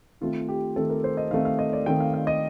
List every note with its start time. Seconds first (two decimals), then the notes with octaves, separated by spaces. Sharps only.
0.21 D#3 A3 C4 F4
0.48 G4
0.76 D#3 A3 C4 A4
0.90 A#4
1.04 C5
1.17 D#5
1.31 D#3 A3 C4 F5
1.45 F5
1.59 D#5
1.73 D5
1.86 D#3 A3 C4 G5
2.00 F5
2.14 F5
2.27 D#5